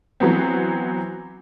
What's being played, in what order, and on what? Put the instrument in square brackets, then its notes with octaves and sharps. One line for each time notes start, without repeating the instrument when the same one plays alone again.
[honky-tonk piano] E3 F#3 B3 C4